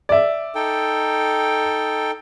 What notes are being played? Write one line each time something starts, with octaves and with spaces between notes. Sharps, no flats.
D5 E5
D#4 A4 G5